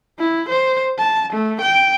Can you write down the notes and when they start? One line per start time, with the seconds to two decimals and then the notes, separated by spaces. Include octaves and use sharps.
0.19 E4
0.49 C5
0.99 A5
1.33 A3
1.61 G5